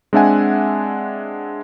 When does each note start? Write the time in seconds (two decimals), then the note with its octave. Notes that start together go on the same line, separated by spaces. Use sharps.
0.13 G#3 C4 D4 E5 F#5 G#5